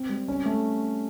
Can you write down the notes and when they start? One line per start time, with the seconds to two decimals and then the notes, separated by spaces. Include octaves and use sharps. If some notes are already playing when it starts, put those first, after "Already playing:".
Already playing: C4
0.09 G3
0.28 C#4
0.46 A3